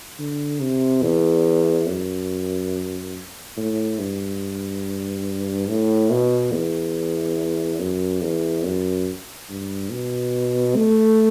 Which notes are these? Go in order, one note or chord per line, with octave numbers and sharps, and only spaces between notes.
D3
C3
E2
F#2
A2
G2
A2
B2
E2
F#2
E2
F#2
G2
B2
A3